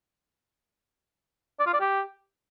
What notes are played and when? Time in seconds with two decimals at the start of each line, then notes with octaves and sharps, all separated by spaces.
1.60 D5
1.67 F4
1.74 D5
1.81 G4